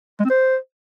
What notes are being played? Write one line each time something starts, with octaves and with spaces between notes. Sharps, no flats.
G#3
C4
C5